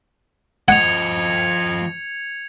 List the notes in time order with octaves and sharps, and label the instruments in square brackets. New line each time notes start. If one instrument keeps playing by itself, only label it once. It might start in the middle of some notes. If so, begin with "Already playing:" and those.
[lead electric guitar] F3 D#5 [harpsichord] F#5 [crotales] G#6 C#7 F7